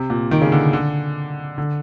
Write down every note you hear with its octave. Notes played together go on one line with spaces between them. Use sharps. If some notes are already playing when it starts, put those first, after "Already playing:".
Already playing: C3
A#2
D#3
C#3
D3
D3
D3